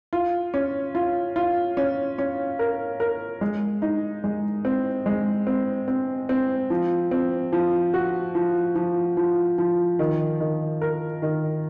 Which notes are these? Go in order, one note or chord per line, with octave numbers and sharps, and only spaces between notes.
F4
C#4
F4
F4
C#4
C#4
A#4
A#4
G#3
D#4
G#3
C4
G#3
C4
C4
C4
F3
C4
F3
F#4
F3
F3
F3
F3
D#3
D#3
A#4
D#3